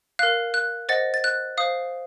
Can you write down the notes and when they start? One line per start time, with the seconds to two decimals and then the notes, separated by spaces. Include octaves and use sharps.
0.19 A#4 F5 F#6
0.54 F#6
0.89 C5 D#5 F#5 A6
1.14 A6
1.24 F#6
1.58 C5 F5 D#6